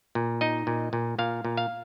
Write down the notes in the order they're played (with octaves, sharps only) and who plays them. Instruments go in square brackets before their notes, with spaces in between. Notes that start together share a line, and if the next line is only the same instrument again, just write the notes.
[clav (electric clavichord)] A#2
D#4 D#5
A#2
A#2
A#2 F5
A#2
F5